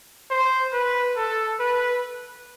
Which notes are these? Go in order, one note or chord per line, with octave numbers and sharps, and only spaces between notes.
C5
B4
A4
B4